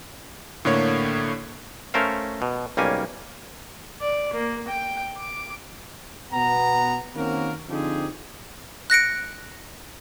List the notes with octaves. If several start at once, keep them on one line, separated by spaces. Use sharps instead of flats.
A2 D3 A#3 C#5
A3 C#4 A#4 C5 F5
B2
B1 G3 A#3 C#4 G#5
D5
A#3
G5
D6
B2 B3 F#5 A#5
D#3 A#3 C4 C#4 F#4 A#4
D3 F3 C4 D#4 G4 G#4
F#6 A#6 C#7 D7